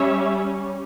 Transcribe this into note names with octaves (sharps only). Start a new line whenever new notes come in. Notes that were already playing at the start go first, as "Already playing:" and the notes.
Already playing: G3 C#4 C#5 E5